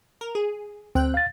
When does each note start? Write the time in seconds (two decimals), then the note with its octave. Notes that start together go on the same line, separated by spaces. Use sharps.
0.21 A#4
0.35 G#4
0.95 D2 C4 G5 F#6
1.14 F5 A6